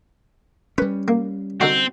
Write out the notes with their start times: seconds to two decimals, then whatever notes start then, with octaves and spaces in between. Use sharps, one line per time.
0.78 G3 C#4 B4
1.08 A#3
1.61 D3 C4 D#4 F#4